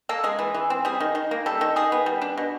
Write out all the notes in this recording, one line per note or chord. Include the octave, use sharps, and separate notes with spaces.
A#3 A4
G#3 G#4
E3
E3
C4
G3 G#4
D#3
D#3
A#3
G3 A4
D#3
D#3 G#4
B3
G3
D4
B2